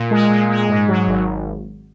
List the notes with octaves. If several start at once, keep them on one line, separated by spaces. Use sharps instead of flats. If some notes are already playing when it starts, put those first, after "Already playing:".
Already playing: A#2
G#3
A#2
G#3
G#2
F#3
G#1